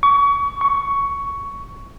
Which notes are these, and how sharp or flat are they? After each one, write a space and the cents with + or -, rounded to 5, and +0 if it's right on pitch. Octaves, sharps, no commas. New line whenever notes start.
C#6 +30
C#6 +10